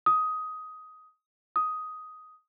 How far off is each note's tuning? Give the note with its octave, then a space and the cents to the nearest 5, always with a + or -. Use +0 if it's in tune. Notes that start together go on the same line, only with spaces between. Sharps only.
D#6 +10
D#6 +5